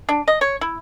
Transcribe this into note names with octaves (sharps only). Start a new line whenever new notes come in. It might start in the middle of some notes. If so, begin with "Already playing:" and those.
D4
D#5
C#5
E4